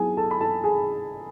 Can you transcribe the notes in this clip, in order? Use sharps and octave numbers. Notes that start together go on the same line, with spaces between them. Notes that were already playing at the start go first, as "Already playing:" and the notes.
Already playing: F#3 B3 E4 G#4 G#5
A4 A5
B5
A4 A5
G#4 G#5